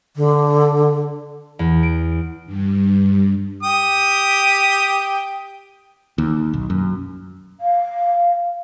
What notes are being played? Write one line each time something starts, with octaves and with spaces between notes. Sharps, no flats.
D3
E2
D7
G2
G4 G5 D#6
D#2
B1
F#2
F5